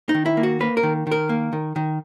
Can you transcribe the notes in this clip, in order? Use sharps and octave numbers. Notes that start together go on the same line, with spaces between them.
D#4
D#3
E4
A#3
F#4
A#3 B4
A#4
D#3
D#3 A#4
A#3
D#3
D#3